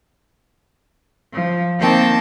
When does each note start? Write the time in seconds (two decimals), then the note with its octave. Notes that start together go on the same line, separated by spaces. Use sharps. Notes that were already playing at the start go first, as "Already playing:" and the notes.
1.33 F3
1.80 D#3 A#3 C4 C5 G5 A5